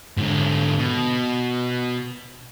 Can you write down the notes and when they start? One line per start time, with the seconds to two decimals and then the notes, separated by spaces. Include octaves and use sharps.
0.17 G#2 D3
0.79 B2